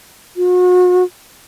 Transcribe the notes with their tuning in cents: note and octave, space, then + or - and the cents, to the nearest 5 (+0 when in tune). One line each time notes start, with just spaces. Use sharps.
F#4 -40